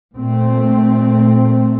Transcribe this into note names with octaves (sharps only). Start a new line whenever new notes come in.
A#2 A3 C4